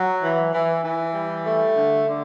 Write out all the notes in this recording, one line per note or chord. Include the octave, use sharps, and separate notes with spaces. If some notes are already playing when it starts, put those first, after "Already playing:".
Already playing: F#3
E3
E3
E3
G3
A3
D3
D3